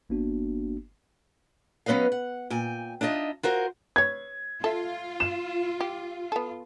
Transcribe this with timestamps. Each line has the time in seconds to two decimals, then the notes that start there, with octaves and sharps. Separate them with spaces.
0.10 G1 A#3 B3 D4 F#4
1.86 F#3 B3 C#4 B4 D#5 F5
2.12 F#5
2.50 A#2 G5 G#5
3.01 D4 D#4 F4 D#5 E5
3.43 F4 F#4 A#4 C5
3.96 B4 C#5 G#6
4.64 F4 A4 E5
5.20 E7
5.81 G4
6.32 B3 A4